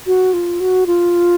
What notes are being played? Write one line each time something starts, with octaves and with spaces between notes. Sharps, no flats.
F#4
F4
F#4
F4